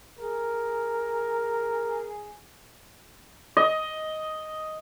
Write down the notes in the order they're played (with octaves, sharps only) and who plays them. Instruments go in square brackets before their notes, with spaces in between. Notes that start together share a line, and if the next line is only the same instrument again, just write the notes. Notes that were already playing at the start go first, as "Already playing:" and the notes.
[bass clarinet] G#4 [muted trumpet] A#4
[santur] D#5